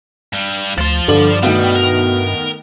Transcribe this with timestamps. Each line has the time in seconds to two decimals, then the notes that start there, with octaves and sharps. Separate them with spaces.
0.33 G2 G3
0.78 D2 F3 C6 A6
1.08 G2 D3 G3 D5 F#7
1.43 B2 D#3 G3 A3 B3
1.75 A#4